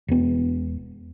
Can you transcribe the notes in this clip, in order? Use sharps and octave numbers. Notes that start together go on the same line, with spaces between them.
E1 B3